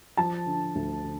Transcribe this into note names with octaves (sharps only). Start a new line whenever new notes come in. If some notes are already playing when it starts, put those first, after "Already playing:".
F3 A5
D3
D2
D3